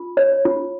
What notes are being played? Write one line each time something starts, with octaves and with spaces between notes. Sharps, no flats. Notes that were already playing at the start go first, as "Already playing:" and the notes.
Already playing: F4
C#5
F4